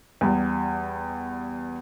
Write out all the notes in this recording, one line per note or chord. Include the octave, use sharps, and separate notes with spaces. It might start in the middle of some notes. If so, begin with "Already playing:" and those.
E2 G3